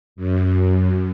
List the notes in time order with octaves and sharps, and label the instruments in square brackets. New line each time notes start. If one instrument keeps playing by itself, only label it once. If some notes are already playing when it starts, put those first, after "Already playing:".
[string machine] F#2